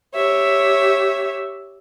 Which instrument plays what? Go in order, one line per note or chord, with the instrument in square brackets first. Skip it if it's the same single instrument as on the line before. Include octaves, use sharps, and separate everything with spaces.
[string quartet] G4 C#5 E5